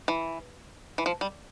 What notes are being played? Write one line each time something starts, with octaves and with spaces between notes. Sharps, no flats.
E3
E3
F3
G3